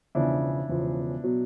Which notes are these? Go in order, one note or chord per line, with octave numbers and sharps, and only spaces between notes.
E1 E2 C#3 F3 D4 E4
E1 E2 C#3 F3
B2 F#3